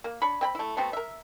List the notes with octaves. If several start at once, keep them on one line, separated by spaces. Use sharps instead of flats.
A#3
D4 C#5 B5
C4 G5 B5
A3 E4
A3 B3 C4 F#4
A#4 E5